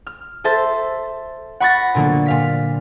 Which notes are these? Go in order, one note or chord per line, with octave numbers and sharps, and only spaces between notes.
F6
A4 C5 E5 A5
F#5 B5 C#6 F#6 A6 A#6
A#2 D3 F#3 A#3 B3
A#2 F5 B6